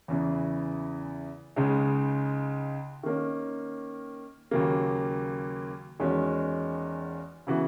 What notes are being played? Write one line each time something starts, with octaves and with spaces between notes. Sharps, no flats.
E2 C#3 E3
C#2 C#3 G#3 D#4
D#3 A#3 C#4
D#2 C#3 F#3 A#3
E2 D#3 G#3 C#4 F#4
C#3 E3 B3 F#4